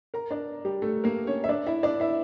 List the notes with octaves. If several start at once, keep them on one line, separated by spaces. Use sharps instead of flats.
A#4 A#5
D4 D5
G3 G4
A3 A4
A#3 A#4
C#4 C#5
E5
D4 D5
E4 E5
D4 D5
E4 E5